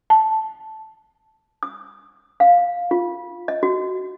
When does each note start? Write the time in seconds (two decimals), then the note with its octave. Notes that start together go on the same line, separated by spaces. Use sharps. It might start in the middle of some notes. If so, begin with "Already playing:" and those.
0.10 A5
1.63 D#6
2.40 F5
2.91 F4
3.48 D#5
3.63 F#4